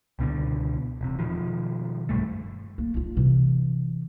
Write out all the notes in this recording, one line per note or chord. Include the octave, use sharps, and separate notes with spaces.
C#2 B2 D3
E1 C3
B2 D#3 F3
F#1 B1 G2 A3
A#3
D4 F4
C3 E3